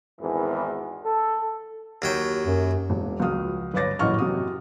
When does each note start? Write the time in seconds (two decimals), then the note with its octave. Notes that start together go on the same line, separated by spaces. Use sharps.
0.19 G#1 E2 E3
1.05 A4
2.02 D#2 F#3 G5
2.46 F#2
2.90 E1
3.20 C#2 F3 F#4 D#6 F6
3.74 G1 B4 C#5 D6 A6 A#6
3.99 D#1 A1 F#2 D#5 C#6 F6
4.19 F#2 C3 F#4 D#6